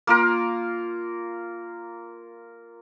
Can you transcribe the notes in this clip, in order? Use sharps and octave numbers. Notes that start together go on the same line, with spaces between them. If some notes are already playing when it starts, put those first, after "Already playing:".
A#3 F4 A#4